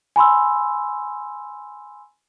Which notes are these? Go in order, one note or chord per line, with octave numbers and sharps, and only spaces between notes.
G#5 B5 C6 E6